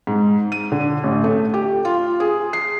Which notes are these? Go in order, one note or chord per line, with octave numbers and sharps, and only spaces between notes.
G#2
D#7
D3
A1
A3
G4
F4
G#4
C7